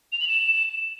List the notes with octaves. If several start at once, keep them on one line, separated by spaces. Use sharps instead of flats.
F7
F#7
E7